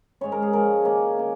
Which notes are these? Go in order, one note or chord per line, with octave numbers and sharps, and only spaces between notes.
G#2 G#3 C#4 C#5
A#4
G#4
A#2 F3 G#3 A#4
D#3 A#3 C#4
A#3 C#4